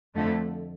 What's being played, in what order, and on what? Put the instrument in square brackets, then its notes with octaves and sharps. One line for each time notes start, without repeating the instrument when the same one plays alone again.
[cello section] F2 D3 A3